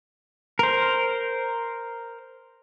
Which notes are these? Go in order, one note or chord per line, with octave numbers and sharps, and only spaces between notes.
A#4 C5